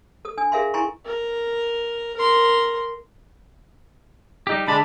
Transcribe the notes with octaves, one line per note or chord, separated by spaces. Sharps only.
A4 D#6
D4 G#5 D#6
G#4 A#4 E5 F5 G#5 C6
E4 G5 G#5 A#5 C6 C#6
A#4
A#4 C6
G3 D#4 G4
D3 G#3 D4 A5 B5